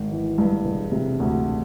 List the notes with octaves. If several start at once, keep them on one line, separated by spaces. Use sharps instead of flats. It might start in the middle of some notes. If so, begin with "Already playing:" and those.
Already playing: G#1
E3
G2
E1
C3
D2